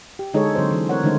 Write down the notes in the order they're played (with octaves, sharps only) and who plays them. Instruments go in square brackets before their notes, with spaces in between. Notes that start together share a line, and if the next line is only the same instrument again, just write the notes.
[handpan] G4
D3 G#3 D#4 G#4 A4 C#5
D3 F#3 C4 C5
E3
A3 C4 A#4 C#5 F#5
D3 D#3 G#3 A3 D#4 C5